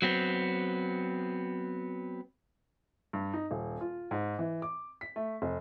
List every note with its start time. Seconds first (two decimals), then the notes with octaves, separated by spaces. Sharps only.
0.02 F#3 B3 C4
3.13 G2
3.33 D#4
3.51 D#1
3.81 F4
4.11 G#2
4.39 E3
4.62 D6
5.01 B6
5.16 A3
5.42 F1